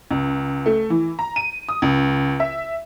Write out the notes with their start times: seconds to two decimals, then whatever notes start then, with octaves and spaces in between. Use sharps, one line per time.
0.11 C#2
0.66 A3
0.90 E3
1.19 A#5
1.36 D#7
1.69 D#6
1.82 C#2
2.40 E5